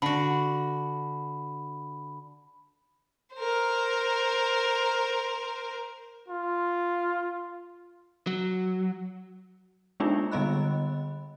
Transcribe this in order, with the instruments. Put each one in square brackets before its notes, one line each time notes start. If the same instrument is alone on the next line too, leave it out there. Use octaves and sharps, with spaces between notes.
[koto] D3 F#4 [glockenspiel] B5
[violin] A#4 C5
[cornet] F4
[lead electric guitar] F#3
[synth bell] G#3 A#3 B3 D4 D#4 F4
D3 G3 B3 D#5 B5 F#6